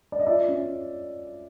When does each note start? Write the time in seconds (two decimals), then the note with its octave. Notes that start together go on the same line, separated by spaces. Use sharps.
0.12 D5
0.20 D#5
0.26 F4 D5 E5
0.48 C#4